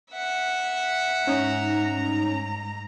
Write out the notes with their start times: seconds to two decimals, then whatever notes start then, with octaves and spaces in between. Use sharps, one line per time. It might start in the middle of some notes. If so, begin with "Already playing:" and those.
0.12 E5 F#5
1.27 G#2 C#4 D#4 A#5